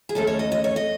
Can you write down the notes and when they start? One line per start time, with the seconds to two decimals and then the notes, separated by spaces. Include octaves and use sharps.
0.09 G#4
0.15 D#2 D#3 A3 C#4 A4
0.27 C#5
0.39 D#5
0.52 D#5
0.64 C#5
0.76 D#5